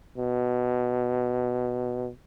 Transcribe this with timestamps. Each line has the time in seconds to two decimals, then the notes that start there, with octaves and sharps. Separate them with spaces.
0.18 B2